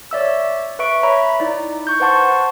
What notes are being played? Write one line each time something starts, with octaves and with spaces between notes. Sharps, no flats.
C#5 D5 E5 E6
B4 E5 C#6 D7
C#5 E5 A#5 B5
D#4 E4 D5
C#6 G6
B4 C5 F#5 A5 C6 C#6